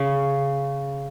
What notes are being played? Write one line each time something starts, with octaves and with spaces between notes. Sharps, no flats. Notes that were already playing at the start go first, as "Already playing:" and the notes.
Already playing: C#3